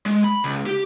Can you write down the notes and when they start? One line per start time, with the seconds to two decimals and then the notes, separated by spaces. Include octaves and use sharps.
0.06 G#3
0.24 B5
0.44 C#2
0.66 G4